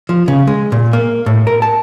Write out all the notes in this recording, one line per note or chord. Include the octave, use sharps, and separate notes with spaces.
F3
C#3
G#3
A#2
A#3
A2
A#4
A5